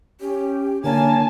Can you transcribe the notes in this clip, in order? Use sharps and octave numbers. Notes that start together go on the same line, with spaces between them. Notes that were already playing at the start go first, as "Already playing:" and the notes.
C#4 G4
D3 A#3 C#5 G#5 A5